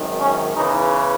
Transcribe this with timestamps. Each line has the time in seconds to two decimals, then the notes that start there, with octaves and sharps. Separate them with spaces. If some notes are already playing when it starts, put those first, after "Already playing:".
Already playing: G#1 F#2 D#3
0.21 C#4
0.56 E2 C#3 E3 D#4